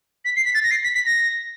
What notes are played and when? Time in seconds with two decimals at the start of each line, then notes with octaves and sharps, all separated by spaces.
0.25 B6
0.36 C7
0.45 B6
0.54 A6
0.63 A#6
0.71 C7
0.83 B6
0.95 B6
1.06 A#6